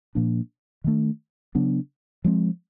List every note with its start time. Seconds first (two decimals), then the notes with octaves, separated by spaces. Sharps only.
0.15 A#2 F3 A#3 D4
0.84 D#3 F#3 A3 D4
1.55 C#3 F#3 B3 D4
2.24 F3 G#3 C4